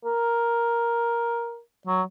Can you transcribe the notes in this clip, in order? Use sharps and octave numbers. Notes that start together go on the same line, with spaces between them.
A#4
F#3